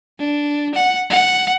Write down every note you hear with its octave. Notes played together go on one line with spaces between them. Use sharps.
D4
F#5
F#5